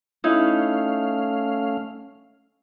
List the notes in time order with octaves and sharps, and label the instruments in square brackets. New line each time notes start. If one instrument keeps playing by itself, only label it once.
[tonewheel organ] A3 C#4 F5 [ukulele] D#4 E4